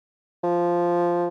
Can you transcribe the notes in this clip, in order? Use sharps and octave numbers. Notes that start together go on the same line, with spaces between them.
F3